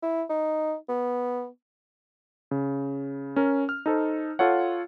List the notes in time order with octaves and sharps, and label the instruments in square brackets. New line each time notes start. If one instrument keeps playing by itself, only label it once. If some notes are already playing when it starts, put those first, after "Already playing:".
[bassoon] E4
D#4
B3
[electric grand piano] C#3
C#4 A#4
F6
D#4 A4 C5
F4 A4 C#5 F#5